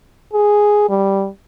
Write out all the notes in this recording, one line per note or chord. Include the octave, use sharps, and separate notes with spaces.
G#4
G3